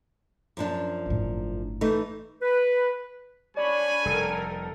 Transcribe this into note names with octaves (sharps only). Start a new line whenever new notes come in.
F#2 F3 D4
G1 A2
E3 A3 D#4
B4
D4 C#5 D5 G#5 B5
F1 G3 A4 A#4